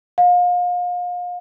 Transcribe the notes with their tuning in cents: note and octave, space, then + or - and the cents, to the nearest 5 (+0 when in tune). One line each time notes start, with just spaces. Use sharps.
F5 +35